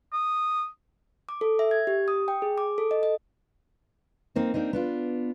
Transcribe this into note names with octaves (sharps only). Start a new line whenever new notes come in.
D#6
D6
A4
E5
G#6
G4
D#6
G5
G#4
D6
A4
D#5
D#5
A#3 C4 D#4
A#3 C4 D4 D#4
B3 D4 F4